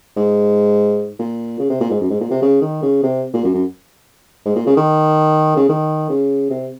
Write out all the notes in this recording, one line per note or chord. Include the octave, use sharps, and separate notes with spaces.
G#2
A#2
C#3
C3
A#2
G#2
F#2
G#2
A#2
C3
C#3
D#3
C#3
C3
A#2
F#2
F#2
G#2
A#2
C#3
D#3
C#3
D#3
C#3
C3